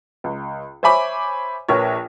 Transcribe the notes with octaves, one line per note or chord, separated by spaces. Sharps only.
C#2
C5 C#5 E5 G#5 B5 D6
A#1 A#4 B4 C#5